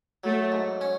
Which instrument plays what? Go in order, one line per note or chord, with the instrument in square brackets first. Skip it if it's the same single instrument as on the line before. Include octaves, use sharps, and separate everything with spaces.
[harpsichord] F#3 [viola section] A3
[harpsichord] G#2
C#4